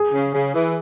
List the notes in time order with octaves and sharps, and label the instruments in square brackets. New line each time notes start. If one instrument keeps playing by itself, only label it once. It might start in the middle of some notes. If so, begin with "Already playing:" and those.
Already playing: [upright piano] G#4
[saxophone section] C#3
C#3
E3